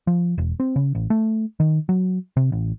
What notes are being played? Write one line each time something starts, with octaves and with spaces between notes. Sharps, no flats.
F3
E1
C4
C#3
A1
A3
D#3
F#3
C3
A1